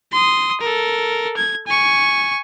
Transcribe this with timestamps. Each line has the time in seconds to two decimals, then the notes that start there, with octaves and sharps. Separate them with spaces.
0.12 C6 D#6
0.61 A4 A#4
1.37 G#6
1.67 G#5 C#6